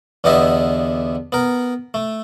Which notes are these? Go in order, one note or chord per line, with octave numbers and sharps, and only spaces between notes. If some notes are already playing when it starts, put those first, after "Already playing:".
E2 D3 B3 G4 D#5 E5
B3 A#4
A3